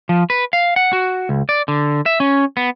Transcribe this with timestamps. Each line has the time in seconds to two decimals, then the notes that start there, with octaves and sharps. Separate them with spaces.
0.09 F3
0.30 B4
0.53 F5
0.76 F#5
0.93 F#4
1.29 C#2
1.49 D5
1.68 D3
2.06 E5
2.20 C#4
2.57 B3